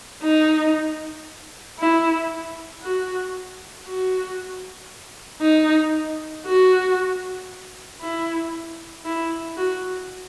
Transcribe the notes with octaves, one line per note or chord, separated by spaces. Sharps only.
D#4
E4
F#4
F#4
D#4
F#4
E4
E4
F#4